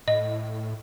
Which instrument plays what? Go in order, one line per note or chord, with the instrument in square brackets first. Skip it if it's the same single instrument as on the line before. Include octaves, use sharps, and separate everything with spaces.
[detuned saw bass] A2 [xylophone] D#5